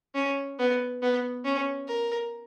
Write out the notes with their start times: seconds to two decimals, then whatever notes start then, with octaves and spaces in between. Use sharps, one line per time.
0.15 C#4
0.59 B3
1.02 B3
1.45 C#4
1.88 A#4